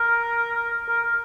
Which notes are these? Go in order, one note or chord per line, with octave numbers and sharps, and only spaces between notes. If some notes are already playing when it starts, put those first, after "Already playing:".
Already playing: A#4
A#4